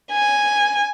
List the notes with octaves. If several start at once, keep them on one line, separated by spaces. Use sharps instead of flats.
G#5